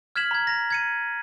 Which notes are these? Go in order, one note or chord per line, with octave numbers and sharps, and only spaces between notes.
F6 G#6 B6 E7 F#7
A#5 G#6
A#5 A#6
G#6 C#7 D#7